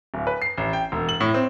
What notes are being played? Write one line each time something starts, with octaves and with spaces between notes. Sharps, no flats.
D1
B4
C7
A1
G5
E1
F#7
A2
C4